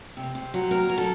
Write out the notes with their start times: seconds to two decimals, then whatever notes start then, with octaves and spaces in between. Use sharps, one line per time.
0.17 C3
0.35 C3
0.54 F#3
0.71 D#2 A#4
0.89 F#3
0.98 A4